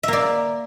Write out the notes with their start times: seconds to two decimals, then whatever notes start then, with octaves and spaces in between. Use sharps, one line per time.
0.03 E5
0.08 A#3
0.13 D5